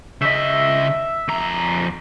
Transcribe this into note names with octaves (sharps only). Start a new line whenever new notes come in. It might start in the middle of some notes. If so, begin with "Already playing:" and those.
C#3 D#5 E5
F2 A#5